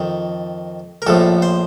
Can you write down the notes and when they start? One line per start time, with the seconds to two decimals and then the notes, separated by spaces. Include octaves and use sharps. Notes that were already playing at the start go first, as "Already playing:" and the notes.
Already playing: F2 D#3
1.02 A#4
1.07 A#1 A2 F3 A4
1.42 C5